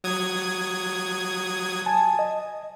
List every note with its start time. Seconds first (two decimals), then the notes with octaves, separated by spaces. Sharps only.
0.04 F#3 D#6 G#6
1.86 G#5 A5
2.19 D#5